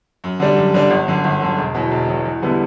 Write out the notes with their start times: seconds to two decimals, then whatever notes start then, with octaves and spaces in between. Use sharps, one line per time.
0.24 F#2
0.40 D3 G3 D4
0.57 F#2
0.74 D3 G3 D4
0.90 G1
1.08 F#2 D3
1.24 G1
1.41 F#2 D3
1.58 E1
1.74 E2 B2 F#3
1.91 E1
2.08 E2 B2 F#3
2.25 E2
2.42 D3 G3 B3 E4